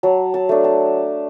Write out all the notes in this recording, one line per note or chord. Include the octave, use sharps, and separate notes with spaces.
F#3 A5
A5
A3 D4
A5